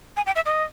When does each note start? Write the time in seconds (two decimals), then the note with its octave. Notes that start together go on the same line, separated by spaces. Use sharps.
0.17 G#5
0.26 G5
0.36 E5
0.46 D#5